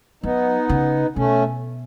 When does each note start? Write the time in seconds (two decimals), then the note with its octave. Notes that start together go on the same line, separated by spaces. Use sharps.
0.24 F#3 B3 D#4
0.69 C#3
1.16 B2 A3 C#4